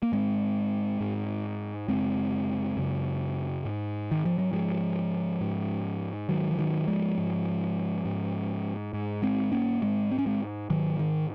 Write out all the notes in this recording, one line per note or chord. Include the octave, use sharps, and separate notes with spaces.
A#3
G#2 G#3 C4
G#2
F#2 C#3 G#3 C4
F#2 C#3
G#2
D#3
F3
F#3
G#2 F3 G#3
G#2
G#2 D#3 F#3
F3
D#3 F#3
F3 G#3
G#2
G#2
G#2
G#3 C4
A#3 C#4
G#2 G#3 C4
C4
C#4
G#3 C4
G#2 D#3 F#3
D#3